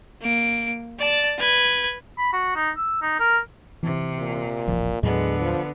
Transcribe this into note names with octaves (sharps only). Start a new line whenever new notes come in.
A#3 D7
D5 A5
B4 G#6
B5
F#4
D#4
E6
D#4
A#4
C3 E3
A#2
D#1 A1 F3
D#2 A2 D3 F#3 G#3 B3
F3